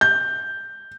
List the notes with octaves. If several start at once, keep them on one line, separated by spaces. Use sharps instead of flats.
G6